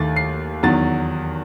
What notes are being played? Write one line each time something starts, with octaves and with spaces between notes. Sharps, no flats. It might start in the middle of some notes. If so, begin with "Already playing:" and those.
Already playing: D#2 D#3 A3 A6
C7
E2 D#3 F#3 A6